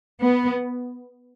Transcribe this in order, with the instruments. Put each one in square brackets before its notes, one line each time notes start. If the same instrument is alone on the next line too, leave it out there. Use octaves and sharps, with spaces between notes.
[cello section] B3